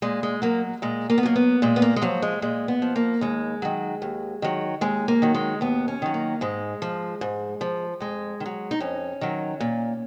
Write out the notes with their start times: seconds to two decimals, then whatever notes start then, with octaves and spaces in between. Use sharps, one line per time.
0.02 A#2 G#3
0.23 G#3
0.42 F#3 A#3
0.82 A#2 G#3
1.10 A#3
1.18 B3
1.23 F#3 A#3
1.36 B3
1.62 A#2 G#3
1.76 B3
1.82 A#3
1.96 G#3
2.02 F3 F#3
2.22 G#3
2.42 A#2 G#3
2.68 B3
2.82 F3
2.96 A#3
3.21 D#2 G#3
3.62 D#3 F#3
4.02 D#2
4.42 D#3 F#3
4.81 D#2 G#3
5.08 A#3
5.22 D#3 F#3
5.34 G#3
5.61 D#2 B3
5.88 C#4
6.02 D#3 F#3
6.14 A#3
6.41 G#2 G#3
6.82 F3
7.21 G#2
7.61 F3
8.00 F2 G#3
8.40 D#3
8.46 F#3
8.71 D#4
8.80 F2 C#4
9.21 D#3 F#3
9.60 A#2